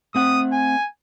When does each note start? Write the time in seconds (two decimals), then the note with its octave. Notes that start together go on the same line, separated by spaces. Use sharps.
0.15 A3 C4 F#5 D#6
0.53 G#5